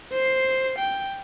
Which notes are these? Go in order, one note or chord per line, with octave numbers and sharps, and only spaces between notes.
C5 C7
G5